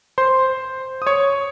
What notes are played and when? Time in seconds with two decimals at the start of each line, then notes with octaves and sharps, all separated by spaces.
0.18 C5 C6
1.02 D#6
1.07 C#5 C#6